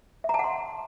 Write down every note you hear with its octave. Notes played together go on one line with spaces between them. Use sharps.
E5 F#5 A5 A#5 C6